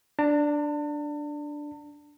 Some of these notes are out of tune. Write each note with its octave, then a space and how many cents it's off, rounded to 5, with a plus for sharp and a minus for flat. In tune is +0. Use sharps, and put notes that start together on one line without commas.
D4 +0 A5 +40